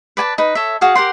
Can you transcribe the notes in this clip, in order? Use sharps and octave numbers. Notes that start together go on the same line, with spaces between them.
B4 D5 G#5 A5
D#4 B4
A4 C#5 E5
F#4 G#4 F5 F#5
G4 A#4 F#5 C6